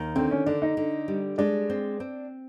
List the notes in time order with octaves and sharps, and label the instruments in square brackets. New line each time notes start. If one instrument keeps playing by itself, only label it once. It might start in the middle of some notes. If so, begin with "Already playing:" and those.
Already playing: [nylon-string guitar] D#2 D#3
[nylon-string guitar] D3 [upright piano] C4
[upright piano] C#4
[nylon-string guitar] D3 [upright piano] D4
[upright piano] D#4
[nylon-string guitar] D3
G3
[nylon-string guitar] G#3 [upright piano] D4
[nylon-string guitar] C4
C4